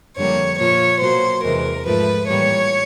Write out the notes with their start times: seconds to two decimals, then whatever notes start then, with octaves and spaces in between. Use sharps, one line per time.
0.17 F2 D3 G3 A#3 C#5
0.59 A#2 F3 A#3 C#5
1.01 B2 F#3 A#3 C5
1.43 E2 C3 E3 G#3 A#4
1.86 G#2 F3 A3 B4
2.28 A2 E3 G3 A#3 C#5